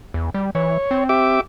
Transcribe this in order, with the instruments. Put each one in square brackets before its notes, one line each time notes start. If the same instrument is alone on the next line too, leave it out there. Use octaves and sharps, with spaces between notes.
[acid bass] E2
G3
[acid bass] E3 [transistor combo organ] C#5
[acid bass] C4
[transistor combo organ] G4 E5 D6